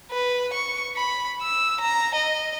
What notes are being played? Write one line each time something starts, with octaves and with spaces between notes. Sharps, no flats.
B4
C#6
B5
E6
A#5
D#5